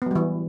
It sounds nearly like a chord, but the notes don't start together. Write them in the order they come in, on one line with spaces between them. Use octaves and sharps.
B3 F#3 G3 E3